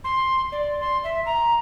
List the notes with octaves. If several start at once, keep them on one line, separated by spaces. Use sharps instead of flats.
C6
D5
C6
E5
A#5